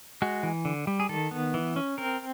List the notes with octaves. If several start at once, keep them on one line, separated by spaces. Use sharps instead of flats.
G#3 F#4
E3
D3
G3
G#4
D#3 A4
B3
E3
C#4
C4 A#4